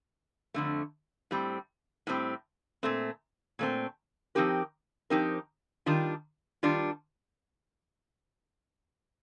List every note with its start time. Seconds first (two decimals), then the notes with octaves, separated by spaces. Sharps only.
0.54 F2 D3 A3
1.31 A2 G3 C4
2.07 A2 G3 C4
2.83 A#2 A3 C4
3.59 A#2 A3 C4
4.35 F3 C4 D#4 G4 A#4
5.10 F3 C4 D#4 G4 A#4
5.86 D#3 G3 D4 F4
6.63 D#3 G3 D4 F4